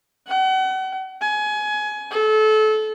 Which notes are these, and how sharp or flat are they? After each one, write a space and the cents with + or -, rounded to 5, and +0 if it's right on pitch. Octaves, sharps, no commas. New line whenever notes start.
F#5 +35
G#5 +25
A4 -25